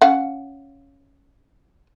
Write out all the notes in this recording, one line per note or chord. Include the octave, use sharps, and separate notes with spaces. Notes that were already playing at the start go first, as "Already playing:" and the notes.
C#4 F5 F#5